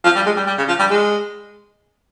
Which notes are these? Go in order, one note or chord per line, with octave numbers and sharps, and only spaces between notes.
F3
G3
G#3
G3
G3
C#3
F3
G3
G#3